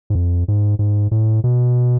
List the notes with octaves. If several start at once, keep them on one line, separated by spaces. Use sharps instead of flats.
G#2
F2
G#2
G#2
A2
B2